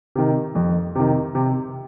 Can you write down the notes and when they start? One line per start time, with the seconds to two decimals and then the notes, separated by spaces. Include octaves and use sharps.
0.15 C3 D#3
0.55 F2
0.95 C3 D#3
1.35 C3